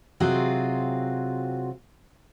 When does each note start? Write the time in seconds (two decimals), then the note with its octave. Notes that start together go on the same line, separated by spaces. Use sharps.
0.20 C3 F#3 C4 F4 F#4 G#4